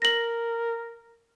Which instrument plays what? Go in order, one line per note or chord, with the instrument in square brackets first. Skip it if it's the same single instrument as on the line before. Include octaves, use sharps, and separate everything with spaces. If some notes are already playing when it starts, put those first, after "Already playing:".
[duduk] A#4 [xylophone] A#6 F#7